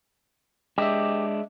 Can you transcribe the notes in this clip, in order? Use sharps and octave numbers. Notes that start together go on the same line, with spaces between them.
G#3 D4 G4 D#5 E5